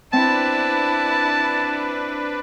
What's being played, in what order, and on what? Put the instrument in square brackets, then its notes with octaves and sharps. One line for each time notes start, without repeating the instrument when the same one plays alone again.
[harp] C4 [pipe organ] D4 B4 [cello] E4 [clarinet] A5